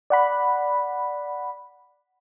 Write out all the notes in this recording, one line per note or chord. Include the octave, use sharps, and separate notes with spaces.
D5 F#5 B5